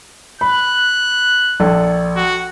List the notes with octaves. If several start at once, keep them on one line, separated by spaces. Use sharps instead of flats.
B5 F#6
A#1 A4
F#4